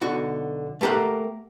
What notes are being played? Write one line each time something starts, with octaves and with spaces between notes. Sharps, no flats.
B1 D3 F#4
A3 A#3 G4 A#4 F#5